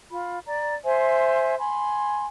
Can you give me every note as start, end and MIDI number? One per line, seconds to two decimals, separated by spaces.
0.10 0.38 65
0.10 0.38 83
0.45 0.74 74
0.45 0.74 82
0.85 1.55 72
0.85 1.55 76
0.85 1.55 80
0.85 1.55 84
1.58 2.26 80
1.58 2.26 83
1.58 2.26 84